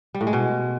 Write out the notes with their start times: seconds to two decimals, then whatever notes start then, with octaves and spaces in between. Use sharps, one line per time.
0.15 G3
0.21 A2
0.27 G#3
0.33 B2